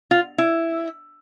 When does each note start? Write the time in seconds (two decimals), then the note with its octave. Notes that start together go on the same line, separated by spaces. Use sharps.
0.11 F4
0.38 E4